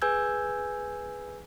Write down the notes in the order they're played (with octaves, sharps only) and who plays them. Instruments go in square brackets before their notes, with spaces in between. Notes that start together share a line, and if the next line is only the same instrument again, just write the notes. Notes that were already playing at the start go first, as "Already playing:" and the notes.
[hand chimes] G#4 B4 G#5 E6 G6 G#6